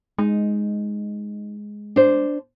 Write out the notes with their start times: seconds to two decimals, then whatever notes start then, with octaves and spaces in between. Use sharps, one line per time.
0.18 G#3 D#4
1.96 D4 C5